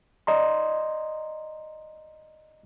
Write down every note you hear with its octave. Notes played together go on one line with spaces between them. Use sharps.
D5 D#5 A#5 C6